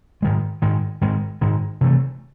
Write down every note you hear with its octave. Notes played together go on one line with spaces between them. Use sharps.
G#2 D#3 G#3
G#2 D#3 G#3
G#2 D#3 G#3
G#2 D#3 G#3
C3 E3 A3